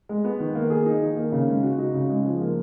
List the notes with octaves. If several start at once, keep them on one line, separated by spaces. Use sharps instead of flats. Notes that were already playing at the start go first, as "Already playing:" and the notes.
G#3
B3
D#3
A#3
G#4
D#4
D#3
A#3
C#3
G#3
F#4
D#4
C#3
G#3
F3
A#3